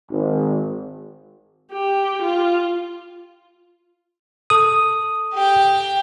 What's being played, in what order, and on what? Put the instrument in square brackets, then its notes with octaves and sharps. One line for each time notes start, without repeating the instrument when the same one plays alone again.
[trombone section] G#1
[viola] G4
F4
[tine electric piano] A4 D#6
[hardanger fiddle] G4 G5